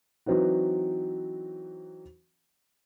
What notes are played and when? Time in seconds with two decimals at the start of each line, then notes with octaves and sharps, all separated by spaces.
0.26 E3 F#3 C4 D#4 F#4